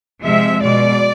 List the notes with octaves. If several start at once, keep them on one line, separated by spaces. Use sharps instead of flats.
C3 F3 G#3 E5
B2 G#3 D5